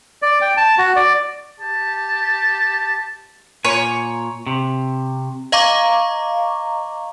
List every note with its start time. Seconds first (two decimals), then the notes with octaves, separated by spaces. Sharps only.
0.22 D5
0.41 G5
0.57 A5
0.78 F#4
0.96 D5
1.58 G4 A5
3.65 A#2 C#5 G#5
4.47 C3
5.52 D#5 F5 A#5 C#6 D6